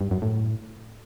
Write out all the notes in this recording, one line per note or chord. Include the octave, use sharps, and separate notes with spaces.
G2
F#2
A2